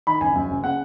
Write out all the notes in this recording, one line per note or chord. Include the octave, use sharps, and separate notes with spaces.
D#3 B5
F#1 G#5
F#2
F#1
C#3 F#5